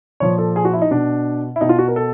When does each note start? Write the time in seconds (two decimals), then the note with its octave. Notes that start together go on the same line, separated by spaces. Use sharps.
0.20 A#2 F3 C#5
0.38 A4
0.56 G#4
0.65 F#4
0.73 E4
0.82 D#4
0.91 B2 D4
1.56 E4
1.61 B2 D#4
1.69 F4
1.79 F#4
1.88 A#4
1.96 A4